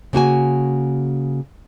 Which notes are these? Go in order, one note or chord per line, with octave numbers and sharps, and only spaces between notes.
C#3 A#3 F#4 G#5